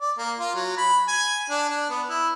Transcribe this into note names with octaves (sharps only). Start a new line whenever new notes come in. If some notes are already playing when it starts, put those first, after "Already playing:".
D5
A#3
F4
F#3
B5
G#5
D4
D4
B3
E4